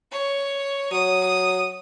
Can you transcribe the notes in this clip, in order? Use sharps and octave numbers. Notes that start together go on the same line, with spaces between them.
C#5
F#3 D#6